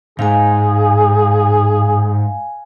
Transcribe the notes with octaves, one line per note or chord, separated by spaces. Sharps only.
G#2 G#4 F5 G#5